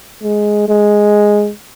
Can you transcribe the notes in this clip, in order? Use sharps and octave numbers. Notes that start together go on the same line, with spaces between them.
G#3
G#3